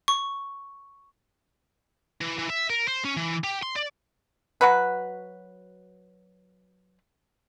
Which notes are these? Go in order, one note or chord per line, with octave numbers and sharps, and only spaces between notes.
C#6
E3
E3
E5
A#4
C5
C#4
E3
G4
C6
D5
F#3 F#4 B4